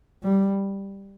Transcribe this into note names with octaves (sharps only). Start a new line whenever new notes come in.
G3